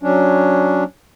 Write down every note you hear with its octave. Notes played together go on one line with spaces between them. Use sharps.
F#3 C#4 D4